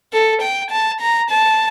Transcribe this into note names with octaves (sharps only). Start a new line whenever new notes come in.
A4
G5
A5
A#5
A5